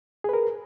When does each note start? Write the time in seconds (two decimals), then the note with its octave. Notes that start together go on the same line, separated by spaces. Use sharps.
0.24 G#4
0.29 B4
0.33 A#4